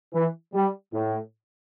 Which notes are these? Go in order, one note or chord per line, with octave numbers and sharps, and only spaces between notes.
E3
G3
A2